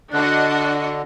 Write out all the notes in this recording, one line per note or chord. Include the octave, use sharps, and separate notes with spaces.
D3 D4 F#4 D#5 F#6